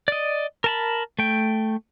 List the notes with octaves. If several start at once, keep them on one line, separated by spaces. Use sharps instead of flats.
D5 D#5
A#4 A5 B5
A3 G5